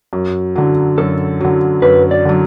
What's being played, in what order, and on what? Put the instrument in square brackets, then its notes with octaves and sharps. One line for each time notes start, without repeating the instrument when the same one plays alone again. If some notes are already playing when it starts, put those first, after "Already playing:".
[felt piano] F#2
D3 F#3
[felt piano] F#2 [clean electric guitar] A4
[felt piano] D3 F#3
[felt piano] F#2 [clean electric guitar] B4
[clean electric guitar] D5
[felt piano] D3 F#3